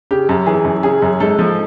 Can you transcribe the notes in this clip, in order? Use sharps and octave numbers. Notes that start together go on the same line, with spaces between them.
C#3 G4
F#2
E3 G#4
F#2
C#3 G#4
F#2
G#2 A4
F3